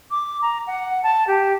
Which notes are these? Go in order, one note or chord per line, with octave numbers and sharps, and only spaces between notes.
D6
A#5
F#5
A5
G4